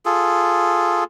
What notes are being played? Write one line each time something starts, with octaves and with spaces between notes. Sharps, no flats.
F4 G#4 A4